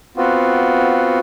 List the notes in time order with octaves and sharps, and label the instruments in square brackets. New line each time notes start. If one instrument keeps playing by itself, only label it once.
[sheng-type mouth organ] B3 C4 F4 F#4